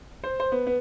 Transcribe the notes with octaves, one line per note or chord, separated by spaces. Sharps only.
C5
C5
B3
B3